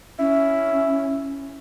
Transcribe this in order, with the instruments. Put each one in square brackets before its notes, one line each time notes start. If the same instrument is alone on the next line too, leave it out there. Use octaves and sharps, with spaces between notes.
[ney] C#4 [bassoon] E4